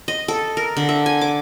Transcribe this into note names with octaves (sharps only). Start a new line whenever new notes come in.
D#5
A4
A#4
D3
E5
G#5
D6